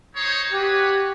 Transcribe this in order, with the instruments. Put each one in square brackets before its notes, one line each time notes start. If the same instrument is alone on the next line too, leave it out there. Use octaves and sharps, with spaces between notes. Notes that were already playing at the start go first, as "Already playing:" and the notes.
[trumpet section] D#4 C5 C#5
[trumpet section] F#4 B4 C#5 [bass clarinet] G4